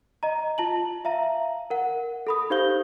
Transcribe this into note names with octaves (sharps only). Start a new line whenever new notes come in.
D#5 A#5
F4 A5 F#7
E5 F5 A#5
A#4 F#5
A4 B5 D#6
D#4 G4 C5 F5 G6 G7